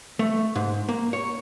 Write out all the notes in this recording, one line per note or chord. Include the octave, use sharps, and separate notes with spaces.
A3
G#2
A#3
C#5